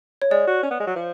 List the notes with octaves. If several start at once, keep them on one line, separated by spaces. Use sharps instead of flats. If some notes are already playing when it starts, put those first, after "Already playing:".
C#5
G#3 D5
F#4
C#4
B3
G#3
F#3
F3